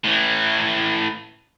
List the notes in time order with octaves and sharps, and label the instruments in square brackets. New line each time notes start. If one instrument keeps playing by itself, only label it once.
[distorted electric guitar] A2 E3